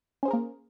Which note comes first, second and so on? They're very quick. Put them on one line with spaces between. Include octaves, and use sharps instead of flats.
C#4 C5 G#4 A#4 A#3